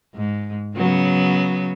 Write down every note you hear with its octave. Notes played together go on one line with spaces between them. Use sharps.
G#2
C#3 F#3 B3